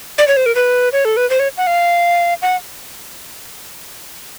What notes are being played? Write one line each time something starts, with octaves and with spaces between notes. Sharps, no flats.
D5
C#5
C5
A#4
B4
C#5
A4
B4
C5
C#5
F#5
F5
F#5